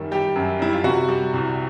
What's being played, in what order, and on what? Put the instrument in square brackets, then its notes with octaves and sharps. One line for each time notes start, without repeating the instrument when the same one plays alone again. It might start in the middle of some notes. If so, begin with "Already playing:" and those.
Already playing: [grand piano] F#2 D#3 G3
[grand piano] G3 [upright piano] G4
[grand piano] F#2
[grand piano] G3 [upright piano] E4
[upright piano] F4
[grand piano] C3 [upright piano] F#4
[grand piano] G3
C2